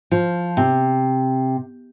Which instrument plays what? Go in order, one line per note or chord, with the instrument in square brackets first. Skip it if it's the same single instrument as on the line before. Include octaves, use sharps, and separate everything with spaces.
[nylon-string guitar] F3
C3